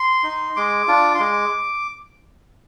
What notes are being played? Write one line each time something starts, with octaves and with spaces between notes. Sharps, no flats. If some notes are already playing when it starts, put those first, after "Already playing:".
Already playing: C6
D#4
G#3 D6
D4 F4
C6
G#3 D6